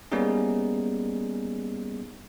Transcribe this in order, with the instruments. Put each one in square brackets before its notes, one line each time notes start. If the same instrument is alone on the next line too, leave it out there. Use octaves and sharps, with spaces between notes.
[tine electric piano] G3 A#3 B3 C#4 D#4 G#4